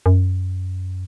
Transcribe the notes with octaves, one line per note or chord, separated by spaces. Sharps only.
F#2